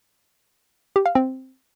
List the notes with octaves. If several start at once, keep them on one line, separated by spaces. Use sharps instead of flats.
G4
F5
C4